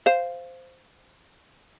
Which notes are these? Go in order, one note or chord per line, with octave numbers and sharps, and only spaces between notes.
C5 F5